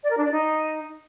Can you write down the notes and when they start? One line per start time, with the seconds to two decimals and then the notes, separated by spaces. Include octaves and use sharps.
0.03 D5
0.10 A#4
0.17 D4
0.24 D5
0.31 D#4